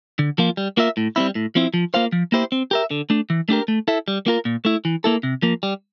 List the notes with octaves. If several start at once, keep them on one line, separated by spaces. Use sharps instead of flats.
D3
F3 A#3 F4
G3
A#3 F4 A#4 E5
A2
G3 C4 E4
A2
F3 C4 E4
F3
A#3 F4 C5 F5
F3
A#3 E4 G4 C5
C4
G4 A#4 E5
D3
A3 D4
E3
A3 D4 G4 A#4
A3
E4 A4 E5
G3
A#3 F4 A#4
A#2
A3 E4
E3
A#3 E4 A4
C3
F3 A#3
G3